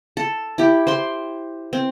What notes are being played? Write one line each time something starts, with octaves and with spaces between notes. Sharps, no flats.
A4
E4 G4
C5 G5 C6
C4